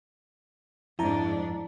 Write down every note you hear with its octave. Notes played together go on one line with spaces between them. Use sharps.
F2 G#2 D4 E4 A5 A#5